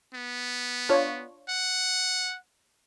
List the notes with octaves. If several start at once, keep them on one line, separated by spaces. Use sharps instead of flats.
B3
D4 F4 C#5
F#5